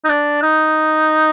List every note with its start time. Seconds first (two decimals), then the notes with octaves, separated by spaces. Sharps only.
0.05 D#4
0.09 D4
0.43 D#4